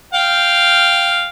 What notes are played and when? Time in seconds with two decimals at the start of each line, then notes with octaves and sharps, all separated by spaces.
0.14 F5 G5